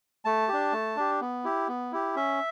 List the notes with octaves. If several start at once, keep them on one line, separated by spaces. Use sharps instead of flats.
A3 A5
D4 G4
A3
D4 G4
B3
E4 G4
B3
E4 G4
C#4 E5